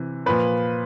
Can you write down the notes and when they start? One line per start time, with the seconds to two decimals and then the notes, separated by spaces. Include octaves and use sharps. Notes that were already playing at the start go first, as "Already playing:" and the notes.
Already playing: C3 E3
0.26 A#2 F3 B4